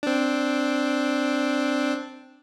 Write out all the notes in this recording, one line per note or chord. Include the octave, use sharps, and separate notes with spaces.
C4 D4